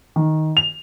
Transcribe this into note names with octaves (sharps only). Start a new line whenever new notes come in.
D#3
F7